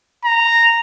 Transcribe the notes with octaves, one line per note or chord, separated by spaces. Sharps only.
A#5